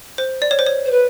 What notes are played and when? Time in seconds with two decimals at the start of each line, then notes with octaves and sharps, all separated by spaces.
0.18 C5
0.42 D5
0.51 C#5
0.59 C5
0.66 C#5
0.85 C5
0.91 B4